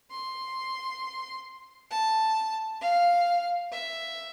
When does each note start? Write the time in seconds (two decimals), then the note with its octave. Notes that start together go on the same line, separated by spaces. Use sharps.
0.11 C6
1.91 A5
2.81 F5
3.72 E5